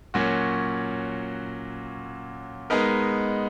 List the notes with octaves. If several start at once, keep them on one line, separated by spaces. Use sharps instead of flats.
A#2 F#3 C#4 F#4
G#3 B3 D#4 A#4